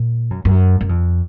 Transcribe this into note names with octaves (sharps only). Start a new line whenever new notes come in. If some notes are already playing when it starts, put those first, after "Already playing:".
Already playing: A#2
F#2
F#2
F#2
F2